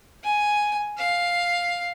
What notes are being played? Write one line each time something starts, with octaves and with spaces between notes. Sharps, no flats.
G#5
F5